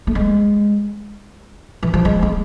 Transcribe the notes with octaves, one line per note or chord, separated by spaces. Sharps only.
A3
G#3
E3
F3
G#3
G#3